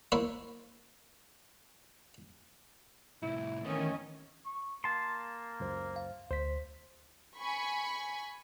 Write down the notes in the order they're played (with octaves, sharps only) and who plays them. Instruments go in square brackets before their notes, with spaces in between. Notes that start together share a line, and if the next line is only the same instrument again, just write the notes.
[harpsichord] A#3 E4 C5 C#5 E5
[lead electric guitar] C2 A2 [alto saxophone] E4
[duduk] D#3 [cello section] E3 C#4 D#5 [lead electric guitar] A3 B3
[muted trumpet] C#6
[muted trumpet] A#3 [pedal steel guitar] A5 C6
[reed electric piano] C#2 F#2 C5
[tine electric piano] F5
[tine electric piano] D2 B6 [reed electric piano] C5
[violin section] G#5 B5 C#6